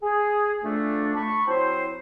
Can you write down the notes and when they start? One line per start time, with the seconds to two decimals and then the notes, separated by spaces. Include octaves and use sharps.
0.02 G#4
0.62 F2 A3 D4
1.15 A5 B5 C#6
1.47 F#3 C4 E4 C5